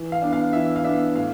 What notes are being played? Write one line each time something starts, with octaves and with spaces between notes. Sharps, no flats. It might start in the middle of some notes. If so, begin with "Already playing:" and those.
Already playing: E3
F5
B3 D4
F5
E3 E5
F5
B3 D4 E5
A2 F5